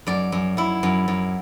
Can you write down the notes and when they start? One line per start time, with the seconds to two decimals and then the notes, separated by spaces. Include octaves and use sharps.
0.07 F#2 D5
0.32 F#2
0.57 F#2 E4
0.83 F#2
1.08 F#2